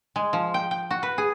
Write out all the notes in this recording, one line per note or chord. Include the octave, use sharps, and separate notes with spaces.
G#3
F3
G5
G5
F#4
B4
G#4